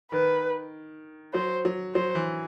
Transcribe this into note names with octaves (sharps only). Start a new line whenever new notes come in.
D#3 B4
F#3 C5
F#3
F#3 C5
E3